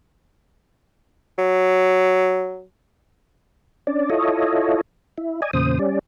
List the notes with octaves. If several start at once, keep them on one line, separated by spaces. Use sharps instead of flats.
F#3
C#4 D4 D5
E4 F4 A4 C#5 D#5
E4
D5 D#5 G#5
E2 A#2 C#3 C5 D#6
G3 C#4 D5